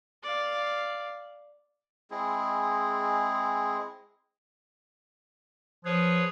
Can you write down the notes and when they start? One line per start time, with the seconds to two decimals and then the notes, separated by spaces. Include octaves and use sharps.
0.23 D5 F5
2.11 G#3 C4 E4 G#4
5.85 F3 G#4 B4 C#5